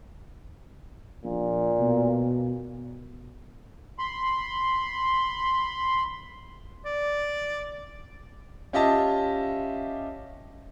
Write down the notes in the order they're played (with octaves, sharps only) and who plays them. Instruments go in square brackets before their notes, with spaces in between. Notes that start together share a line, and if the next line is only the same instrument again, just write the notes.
[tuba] A#1 [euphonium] A#2
[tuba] B2
[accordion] B5 C6
[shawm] D5
[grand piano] C#4 F4 G4 D#5 E5 A5